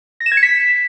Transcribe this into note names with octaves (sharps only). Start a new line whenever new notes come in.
A#6
E7
G#6
C#7
B6